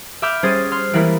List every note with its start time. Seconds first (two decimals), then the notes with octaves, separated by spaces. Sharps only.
0.22 E5 B5 D6 E6 F6 G6
0.43 G3 C#4 G#4 C5 D#6 A6
0.71 C6 F6
0.93 E3 G3 G#3 A#3 E4 B5